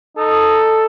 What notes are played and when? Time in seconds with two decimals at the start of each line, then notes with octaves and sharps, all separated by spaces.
0.17 D#4 A4